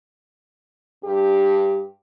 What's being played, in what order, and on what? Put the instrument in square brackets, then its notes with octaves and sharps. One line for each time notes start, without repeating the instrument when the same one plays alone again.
[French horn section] G2 G4